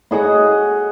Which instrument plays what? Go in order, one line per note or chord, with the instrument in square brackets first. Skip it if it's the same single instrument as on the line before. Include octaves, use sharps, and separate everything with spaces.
[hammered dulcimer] F#4 G#4 D#5 F#5